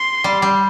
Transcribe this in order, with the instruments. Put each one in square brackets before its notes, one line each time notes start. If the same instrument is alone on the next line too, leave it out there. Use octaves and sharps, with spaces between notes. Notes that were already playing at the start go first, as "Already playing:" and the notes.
Already playing: [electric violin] C6
[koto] G3
G3